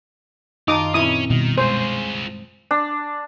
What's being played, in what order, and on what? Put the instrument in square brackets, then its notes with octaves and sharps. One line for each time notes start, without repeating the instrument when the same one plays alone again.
[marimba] F#2 D#3 A5 [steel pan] D#4 D6 D#6 [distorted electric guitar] F4
[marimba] A#2 C4 [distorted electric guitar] C#4 [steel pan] E4 D#6
[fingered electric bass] B2 [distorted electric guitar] D#3 [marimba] G3
[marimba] G#3 [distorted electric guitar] F4 G#4 [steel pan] C5
[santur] D4